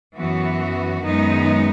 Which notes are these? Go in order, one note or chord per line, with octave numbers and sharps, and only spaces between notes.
F#2 E3 B3 F#4
F#2 D#3 G#3 B3 D#4